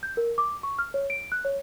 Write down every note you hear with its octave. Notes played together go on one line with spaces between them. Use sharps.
G6
A#4
D6
C#6
F6
C#5
D7
F#6
C#5